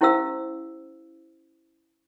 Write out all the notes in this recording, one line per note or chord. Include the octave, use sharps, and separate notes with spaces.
C#4 E4 G4 C5 F5 E6